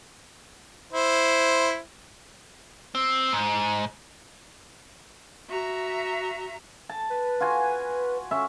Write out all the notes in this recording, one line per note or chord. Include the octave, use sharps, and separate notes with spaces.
E4 C5
C4
G#2
F#4 E5 A#5
A5
B4
F4 F#4 G#5
C#4 E5 C#6